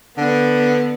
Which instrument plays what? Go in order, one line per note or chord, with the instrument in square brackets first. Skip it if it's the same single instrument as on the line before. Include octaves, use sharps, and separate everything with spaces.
[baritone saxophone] D3 [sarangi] B3